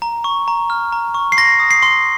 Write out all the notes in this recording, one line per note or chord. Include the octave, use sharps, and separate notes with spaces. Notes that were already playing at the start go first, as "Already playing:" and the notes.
A#5
C#6
A#5
F6
A#5
C#6
C7
C6 A#6
D#6
C7
C6